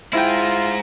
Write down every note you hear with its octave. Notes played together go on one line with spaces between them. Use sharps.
G#3 E4 F4 C5 G5